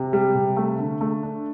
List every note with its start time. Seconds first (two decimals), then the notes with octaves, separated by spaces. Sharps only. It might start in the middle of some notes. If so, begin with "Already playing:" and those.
Already playing: C3
0.13 G3
0.35 C3
0.57 A3
0.78 D3
1.01 A3
1.23 D4